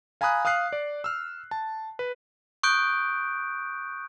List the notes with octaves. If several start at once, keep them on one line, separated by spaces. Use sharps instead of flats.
F5 G#5 A#5 B5 D#6 F#6
F5 D#6 F6 F#6 C7
D5
E6 F6
A5
B4
C#6 D#6 F#6 G6 D7